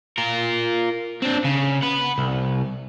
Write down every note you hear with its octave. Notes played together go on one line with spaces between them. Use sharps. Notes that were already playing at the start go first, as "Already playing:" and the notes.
F4 A#4
C4 D4
C#3
F#5 B5
C2